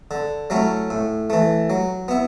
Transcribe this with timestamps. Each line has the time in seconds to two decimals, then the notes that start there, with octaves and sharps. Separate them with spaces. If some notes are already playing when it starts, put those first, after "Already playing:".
0.11 D3
0.50 F#3 A3 C#4 E4
0.90 A2
1.30 E3 A3
1.70 F#3
2.08 B3 E4